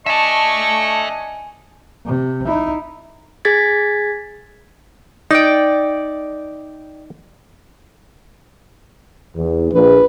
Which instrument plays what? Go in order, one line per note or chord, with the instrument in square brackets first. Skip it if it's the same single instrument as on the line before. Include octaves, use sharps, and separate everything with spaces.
[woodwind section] D4 D#5 G#5 [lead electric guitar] E5 A5 [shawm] C#6
[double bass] C3
D#4 E4
[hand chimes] G#4 G#6 A6 B6
[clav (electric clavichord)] D#4 [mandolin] D5 G5
[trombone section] E2
[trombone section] A#1 [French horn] B4